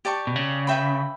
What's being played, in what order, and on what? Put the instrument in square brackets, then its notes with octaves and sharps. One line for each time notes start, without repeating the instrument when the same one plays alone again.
[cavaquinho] G4 D5 A5 C#6
[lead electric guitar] B2
C#3
[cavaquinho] B4 E5 G5 B5